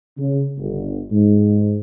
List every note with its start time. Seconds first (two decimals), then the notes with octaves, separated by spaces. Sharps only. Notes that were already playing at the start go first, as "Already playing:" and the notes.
0.18 C#3
0.59 G1
1.11 G#2